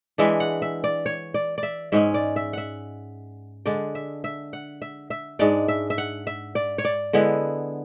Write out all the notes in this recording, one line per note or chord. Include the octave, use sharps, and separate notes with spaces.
E3 G#3 D4 E5
F#5
E5
D5
C#5
D5
D5
E5
G#2 G#3 C#4 E5
D5
E5
E5 F#5
D3 G#3 D4 D5
E5
E5
F#5
E5
E5
G#2 G#3 D4 D5
E5
E5
F#5
E5
D5
C#5
D5
D3 G#3 B3 E4